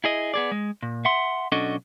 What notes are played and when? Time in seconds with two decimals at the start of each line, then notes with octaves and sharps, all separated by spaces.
0.04 E4 G#4 D#5
0.34 B3 G#4 D5
0.52 G#3
0.83 A#2
1.05 E5 F#5 C6
1.52 B1 C#4 D4 F#4 A4 D#5